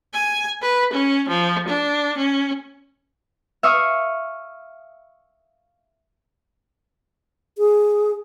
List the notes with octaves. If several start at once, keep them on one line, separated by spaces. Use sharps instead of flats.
G#5
B4
C#4
F3
D4
C#4
E5 F5 C#6 D#6
G#4